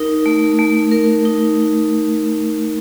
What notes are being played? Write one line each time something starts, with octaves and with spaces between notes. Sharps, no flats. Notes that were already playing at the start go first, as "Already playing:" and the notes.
Already playing: D#4 A#4
A3
A3
A#4
D#4